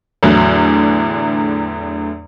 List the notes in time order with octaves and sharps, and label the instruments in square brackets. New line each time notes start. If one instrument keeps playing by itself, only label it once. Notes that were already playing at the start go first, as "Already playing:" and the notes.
[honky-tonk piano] E2 A2 D3 F#3